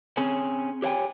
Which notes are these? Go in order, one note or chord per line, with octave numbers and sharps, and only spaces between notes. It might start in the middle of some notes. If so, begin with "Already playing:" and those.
C4 C#4 G#4 C#5
G4 C#5 E5 G5 G#5